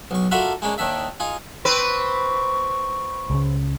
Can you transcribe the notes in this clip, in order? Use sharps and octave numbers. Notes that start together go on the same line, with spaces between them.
B1 C#6
F4 F#4 A4 A#4 D5 E5
G#3 A#3 C#4 D4
D#2 D#3 D4 E5
D#4 F4 G#4
C4 B4 C#6
C#2 C#3